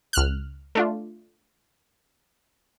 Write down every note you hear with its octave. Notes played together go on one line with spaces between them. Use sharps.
C#2 F6 F#6
A3 D4 F4